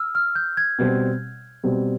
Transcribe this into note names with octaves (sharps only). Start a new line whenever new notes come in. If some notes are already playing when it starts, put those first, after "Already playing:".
Already playing: E6 F6
F6
G6
G#6
B2 G3 C4
B2 G3 C4